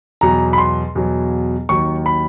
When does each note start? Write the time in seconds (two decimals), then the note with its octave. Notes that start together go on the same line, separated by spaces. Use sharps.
0.21 E2 B2 F#3 A#5
0.53 B5
0.58 C6
0.95 E2 B2 F#3
1.69 D#2 D#3 F#3 C#6
2.06 B5